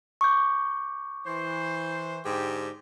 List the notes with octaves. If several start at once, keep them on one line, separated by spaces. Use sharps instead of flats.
C#6 D6 G6
E3 C5
G#2 D3 G4